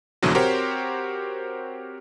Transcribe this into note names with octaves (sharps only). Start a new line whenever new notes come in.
C2 G#2 B2 D3 E3 F#3
C4 F#4 G4 A#4 C5 C#5